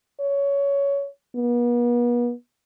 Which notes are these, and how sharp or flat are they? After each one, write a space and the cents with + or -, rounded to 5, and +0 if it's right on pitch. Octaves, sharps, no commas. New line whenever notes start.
C#5 +15
B3 -40